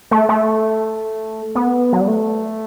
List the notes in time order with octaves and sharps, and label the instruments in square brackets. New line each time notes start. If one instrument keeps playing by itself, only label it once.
[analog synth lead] A3
A3
B3
F#3
G3
A3